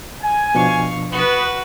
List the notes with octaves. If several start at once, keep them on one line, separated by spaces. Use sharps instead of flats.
G#5
B2 F3 D4 F5 C#6
B3 F#4 B4